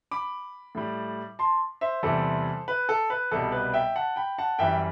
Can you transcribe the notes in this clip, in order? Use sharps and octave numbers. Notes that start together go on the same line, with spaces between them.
B5 D6
A2 G3
A5 C6
C5 E5
E2 C3 E3 G3 A4 C5
B4
A4
B4
C2 B2 G3 A4
B4
E5 G5
F#5 A5
G5 B5
F#5 A5
F#2 E3 G3 E5 G5